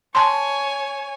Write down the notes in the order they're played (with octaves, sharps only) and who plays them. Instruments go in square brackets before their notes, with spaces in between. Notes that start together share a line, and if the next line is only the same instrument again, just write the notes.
[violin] C#5 G#5 [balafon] A5 C6